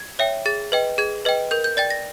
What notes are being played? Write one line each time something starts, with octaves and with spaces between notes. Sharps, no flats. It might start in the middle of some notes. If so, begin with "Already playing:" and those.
Already playing: G#6
C#5 E5 G5
G#4 A6
B4 D#5 G5
G#4 G#6
B4 D#5 G5
A#4 G6
G6
D5 G5 A6
A#6